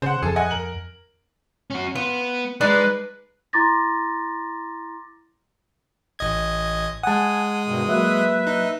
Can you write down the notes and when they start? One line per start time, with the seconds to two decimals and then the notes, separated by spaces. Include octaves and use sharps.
0.02 C#3 C5 F#5
0.22 F2 G#4 A4
0.36 D#5 F#5 G#5
0.51 A#4 F#7
1.70 C#4 F#4
1.95 B3 F4
2.61 G#3 D#4 B4 D5
3.53 E4 A#5 C6 D6 A6 A#6
6.19 A1 D#5 G#6
7.03 G#3 F#5 G#5 A5 D#6
7.67 G2 B2 D#3
7.89 F#3 A#3 B4 E5
8.47 D#4